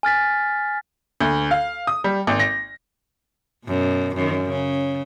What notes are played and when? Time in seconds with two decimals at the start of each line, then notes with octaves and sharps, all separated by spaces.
0.03 G#5 F6 A6 B6
1.21 D2
1.51 F5
1.87 D#6
2.04 G3
2.27 G#1
2.40 A#6
3.65 F#2 B2
4.16 F#2 D#3
4.45 C#3